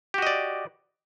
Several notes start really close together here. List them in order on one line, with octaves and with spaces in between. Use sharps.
G4 F#4 D#5 D5